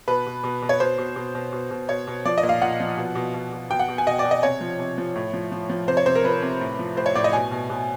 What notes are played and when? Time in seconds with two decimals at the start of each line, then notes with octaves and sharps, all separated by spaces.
0.08 B2 B4
0.26 B2
0.44 B2
0.62 B2
0.69 C#5
0.80 B2 C5
0.98 B2
1.16 B2
1.35 B2
1.53 B2
1.71 B2
1.89 B2 C#5
2.07 B2
2.25 F3 D5
2.38 D#5
2.43 A#2
2.49 F5
2.62 A#2 F#5
2.80 F3
2.97 B2
3.15 B2
3.34 B2
3.53 B2
3.70 B2 G5
3.79 F#5
3.88 B2
3.98 G#5
4.07 B2 D#5
4.19 D5
4.25 B2
4.31 D#5
4.43 C3 C#5
4.61 F3
4.79 C3
4.98 F3
5.16 A2
5.33 F3
5.52 F3
5.70 F3
5.88 C3 C5
5.97 C#5
6.06 C3 C5
6.15 A#4
6.24 F3 B4
6.42 C3
6.61 A2
6.79 F3
6.97 A2 C5
7.06 C#5
7.15 A2 D5
7.24 D#5
7.33 B2 G#5
7.51 B2
7.70 B2